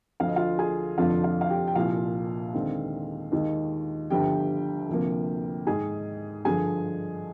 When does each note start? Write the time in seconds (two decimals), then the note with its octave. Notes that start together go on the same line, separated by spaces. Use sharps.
0.20 D2 D3 F3 F5
0.28 D#5
0.36 F4 F5
0.58 G#4 G#5
0.98 F1 F2 D3 F3 F4 F5
1.24 F4 F5
1.41 F5
1.50 G4 G5
1.67 G5
1.75 C2 A#2 F3 F4 F5
2.54 D#2 D3 G#3 C4
3.32 D#2 D#3 G#3
4.10 G1 G2 D3 F3 G4 G5
4.89 D2 C3 F3 A#3
5.67 G#2 D#3 G#3 G#4 G#5
6.45 G2 D3 F3 G#4 G#5